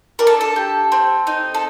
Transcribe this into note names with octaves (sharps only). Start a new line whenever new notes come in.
D4 A#4
A4
A4
G4
C4
D#4
A4